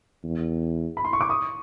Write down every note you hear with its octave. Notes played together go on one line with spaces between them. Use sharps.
E2
B5
C6
C#6
D6
C#6 D#6